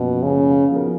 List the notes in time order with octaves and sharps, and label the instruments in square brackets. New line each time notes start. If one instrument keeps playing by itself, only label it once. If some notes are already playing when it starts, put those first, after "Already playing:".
Already playing: [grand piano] F#2 F3 A#3 [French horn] B2
[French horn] C#3
[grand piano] F3 B3 D#4 F#4 A#4